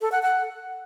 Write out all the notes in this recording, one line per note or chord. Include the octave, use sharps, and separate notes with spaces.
A4
F#5
F#5